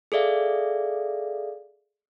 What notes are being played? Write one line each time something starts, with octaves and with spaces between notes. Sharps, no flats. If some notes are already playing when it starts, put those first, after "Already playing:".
G#4 A4 D5 E5 F5